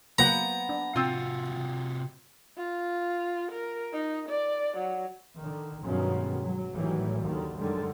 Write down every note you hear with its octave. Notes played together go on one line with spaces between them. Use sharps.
F#3 A#3 B3 B4 C5 F#5 A#5
D4
C3 C4 F4 F#4
F4
A#4
D#4
D5
F#3
D3 D#3
G2 B2 D#3 F#3 G#3 C#4
F#3
A2 D#3 E3 F#3 G3
D#2 D3 D#3
F#2 D3 D#3 G3 G#3